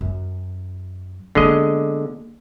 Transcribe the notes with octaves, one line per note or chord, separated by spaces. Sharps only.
F#2 F#3
D3 G#3 A#3 B3 D#5